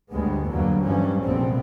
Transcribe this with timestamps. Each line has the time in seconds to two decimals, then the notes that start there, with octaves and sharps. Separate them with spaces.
0.11 G1 D2 G3 G#3 B3
0.48 E2 G2 D3 F#3 A#3
0.84 G2 E3 F3 G3 C#4
1.23 F1 A#1 G3 A3 B3 C4